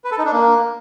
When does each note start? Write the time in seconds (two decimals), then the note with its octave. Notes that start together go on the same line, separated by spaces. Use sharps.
0.04 B4
0.11 A4
0.18 D#4
0.25 D4
0.32 A#3